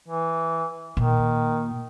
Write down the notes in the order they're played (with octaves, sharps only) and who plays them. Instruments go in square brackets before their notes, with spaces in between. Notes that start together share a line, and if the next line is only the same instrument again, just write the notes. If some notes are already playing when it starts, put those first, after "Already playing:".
[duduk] E3
[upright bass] A#2 [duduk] D#3